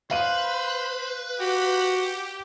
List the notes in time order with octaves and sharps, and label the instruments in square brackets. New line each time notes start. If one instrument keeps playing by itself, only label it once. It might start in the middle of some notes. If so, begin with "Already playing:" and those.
[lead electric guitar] B4 [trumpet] C5 [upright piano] F5 D#7 F#7
[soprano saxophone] F#4 [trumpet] G4